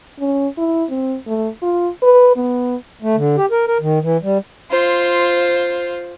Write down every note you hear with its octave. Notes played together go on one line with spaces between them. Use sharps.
C#4
E4
C4
A3
F4
B4
B3
A3
D3
G4
A#4
A#4
D#3
E3
G3
F4 C5